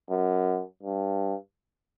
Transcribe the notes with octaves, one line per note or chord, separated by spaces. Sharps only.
F#2
G2